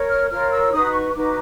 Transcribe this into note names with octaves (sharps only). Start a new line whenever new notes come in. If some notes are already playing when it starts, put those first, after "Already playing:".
Already playing: A#4 C#5
F6
F4 A#4 C#5 F6
E6
D#4 F#4 B4 D#6
C#6
D#4 F#4 B4 D6